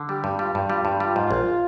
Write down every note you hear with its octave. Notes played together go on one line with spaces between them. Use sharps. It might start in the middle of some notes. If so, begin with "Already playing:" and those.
Already playing: D3
G3 G4
G2
G3 F4
G2
G3 F4
G2
G3 F4
G#2
A#1